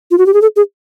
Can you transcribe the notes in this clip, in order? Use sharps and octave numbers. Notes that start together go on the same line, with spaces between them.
F4
F#4
G4
G#4
A4
G#4